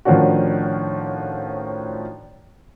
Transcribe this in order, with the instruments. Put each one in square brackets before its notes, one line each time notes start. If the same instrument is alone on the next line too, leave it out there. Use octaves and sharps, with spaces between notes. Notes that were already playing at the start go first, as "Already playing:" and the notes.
[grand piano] A2 D#3 F3 C#4 D4 F#4